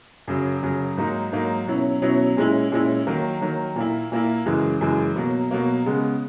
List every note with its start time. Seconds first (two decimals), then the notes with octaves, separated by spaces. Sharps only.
0.28 F#2 C#3 F#3
0.63 F#2 C#3 F#3
0.97 G#2 F#3 A#3 D#4
1.32 G#2 F#3 A#3 D#4
1.67 B2 F#3 C#4 E4
2.02 B2 F#3 C#4 E4
2.37 A#2 G#3 C#4 E4
2.72 A#2 G#3 C#4 E4
3.07 D#3 F#3 A#3
3.41 D#3 F#3 A#3
3.76 A#2 A#3 E4
4.12 A#2 A#3 E4
4.46 F#2 C#3 E3 G#3
4.81 F#2 C#3 E3 G#3
5.16 B2 F#3 A#3
5.51 B2 F#3 A#3
5.86 C#3 G#3 B3